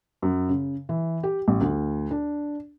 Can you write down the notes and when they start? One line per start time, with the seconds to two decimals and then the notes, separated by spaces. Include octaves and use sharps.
0.22 F#2
0.49 C#3
0.89 E3
1.23 G4
1.48 A1
1.61 D2
2.11 D4